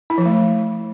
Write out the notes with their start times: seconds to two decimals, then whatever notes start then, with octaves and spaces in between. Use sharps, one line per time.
0.10 E4
0.18 F3
0.26 A3